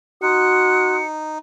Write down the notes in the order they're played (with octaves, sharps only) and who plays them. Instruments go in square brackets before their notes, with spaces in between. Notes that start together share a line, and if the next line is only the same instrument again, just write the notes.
[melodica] D#4 [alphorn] F#4 [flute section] C6 D#6 F#6 [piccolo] C#7